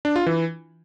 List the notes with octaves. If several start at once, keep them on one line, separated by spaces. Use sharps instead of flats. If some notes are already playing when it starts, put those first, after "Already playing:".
D4
F4
E3